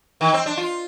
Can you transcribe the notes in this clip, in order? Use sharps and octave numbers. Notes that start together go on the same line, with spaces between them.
D#3
C4
D4
F4